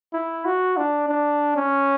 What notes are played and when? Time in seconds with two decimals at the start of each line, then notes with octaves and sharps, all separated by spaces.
0.14 E4
0.45 F#4
0.77 D4
1.09 D4
1.57 C#4